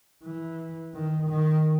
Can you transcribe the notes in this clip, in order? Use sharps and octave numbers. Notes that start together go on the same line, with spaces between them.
E3
D#3
D#3